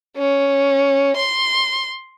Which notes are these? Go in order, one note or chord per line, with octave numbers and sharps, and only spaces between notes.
C#4
C6